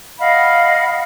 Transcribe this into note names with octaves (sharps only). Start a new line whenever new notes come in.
D#5 F5 F#5 B5